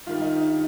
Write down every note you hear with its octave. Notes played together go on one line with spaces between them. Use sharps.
G2 D#3 G3 F4
D#4
D#4